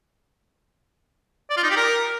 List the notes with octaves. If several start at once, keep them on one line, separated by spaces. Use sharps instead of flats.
D5
F4
D#4
G4
A#4